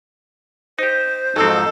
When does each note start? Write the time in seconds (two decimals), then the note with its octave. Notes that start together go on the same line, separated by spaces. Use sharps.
0.79 D#4 G4 C5
1.36 F2 G#2 F#3 C4 D#4 A4